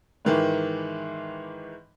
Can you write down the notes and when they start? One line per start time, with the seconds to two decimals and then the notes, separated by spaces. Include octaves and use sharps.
0.25 G#2 D#3 E3